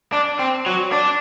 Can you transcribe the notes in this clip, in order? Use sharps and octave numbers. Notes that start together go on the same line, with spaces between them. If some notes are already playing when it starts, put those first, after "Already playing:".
D4
C4
F#3
D4